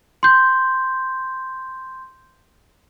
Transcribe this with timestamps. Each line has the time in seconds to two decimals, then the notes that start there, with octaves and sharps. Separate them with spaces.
0.23 C6 G6